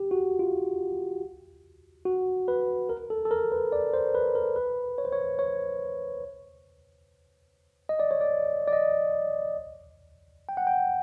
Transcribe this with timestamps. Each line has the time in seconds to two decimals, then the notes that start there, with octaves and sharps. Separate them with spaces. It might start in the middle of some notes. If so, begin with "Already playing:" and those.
Already playing: G4
0.11 F#4
0.39 F4
2.05 F#4
2.48 B4
2.89 A#4
3.10 A4
3.25 A4
3.31 A#4
3.52 B4
3.72 D5
3.94 C5
4.15 B4
4.35 A#4
4.56 B4
4.98 C#5
5.05 C5
5.13 C#5
5.39 C#5
7.89 D#5
8.00 D5
8.11 C#5
8.21 D5
8.67 D5
8.73 D#5
10.49 G5
10.57 F#5
10.67 G5